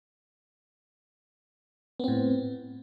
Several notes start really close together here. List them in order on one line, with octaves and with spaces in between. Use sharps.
B3 C4 A2